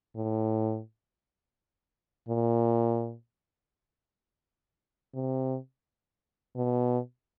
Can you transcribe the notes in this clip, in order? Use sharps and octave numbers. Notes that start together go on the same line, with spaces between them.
A2
A#2
C3
B2